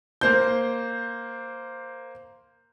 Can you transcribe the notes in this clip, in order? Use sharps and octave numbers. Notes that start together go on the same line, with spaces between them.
A#3 C5 G6